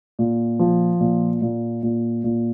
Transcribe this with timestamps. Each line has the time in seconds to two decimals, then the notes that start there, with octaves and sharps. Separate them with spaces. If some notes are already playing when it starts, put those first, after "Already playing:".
0.19 A#2
0.59 F3
1.00 A#2
1.42 A#2
1.83 A#2
2.24 A#2